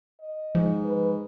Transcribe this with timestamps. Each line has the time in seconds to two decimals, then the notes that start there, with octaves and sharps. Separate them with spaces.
0.20 D#5
0.55 G#2 F3
0.85 B4